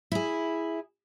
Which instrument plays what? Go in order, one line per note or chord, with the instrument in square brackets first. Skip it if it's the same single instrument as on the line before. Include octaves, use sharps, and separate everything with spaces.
[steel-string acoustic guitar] E4 G#4